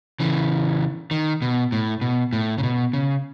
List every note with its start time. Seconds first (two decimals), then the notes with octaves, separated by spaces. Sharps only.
0.20 C#3 E3
1.11 D#3
1.42 B2
1.72 A2
2.01 B2
2.33 A2
2.58 C#3
2.63 B2
2.93 C#3